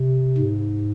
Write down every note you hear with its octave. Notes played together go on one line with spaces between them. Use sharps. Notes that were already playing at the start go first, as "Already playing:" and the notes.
Already playing: C3
G#2